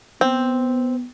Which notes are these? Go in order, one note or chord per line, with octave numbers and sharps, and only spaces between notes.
B3 C4